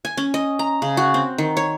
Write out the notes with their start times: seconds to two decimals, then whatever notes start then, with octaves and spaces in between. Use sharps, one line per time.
0.05 G#5
0.17 C#4
0.34 D#5
0.59 A#5
0.82 C#3
0.97 F#4
1.14 C4
1.38 D#3
1.57 C#5